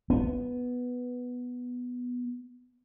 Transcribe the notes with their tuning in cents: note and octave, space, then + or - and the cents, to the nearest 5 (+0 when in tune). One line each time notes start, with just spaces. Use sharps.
B3 +0